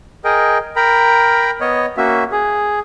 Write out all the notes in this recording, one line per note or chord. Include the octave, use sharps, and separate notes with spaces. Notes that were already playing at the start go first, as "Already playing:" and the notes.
G#4 A#4 D#5 G5
A#4 G5 A#5 B5
B3 C#5 D#5
A#3 C#4 F#4 E5
G#4